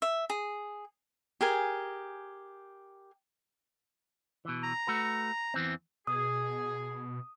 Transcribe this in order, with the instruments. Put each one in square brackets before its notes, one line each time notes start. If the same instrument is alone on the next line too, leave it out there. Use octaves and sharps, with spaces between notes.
[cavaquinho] E5
G#4
G4 G#4 A#4 G#5
[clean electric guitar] B2 E3
[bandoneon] A#5
[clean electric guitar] A3 F#4 B4
E2 E3 C4
[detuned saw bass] B2 [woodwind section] G#4 [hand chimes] D#6